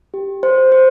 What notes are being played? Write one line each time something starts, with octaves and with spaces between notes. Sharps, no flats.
G4
C5
C5